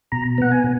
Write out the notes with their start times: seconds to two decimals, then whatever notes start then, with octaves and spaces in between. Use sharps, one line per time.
0.12 B2 A#5
0.38 B3 F#5
0.52 G#5
0.64 B2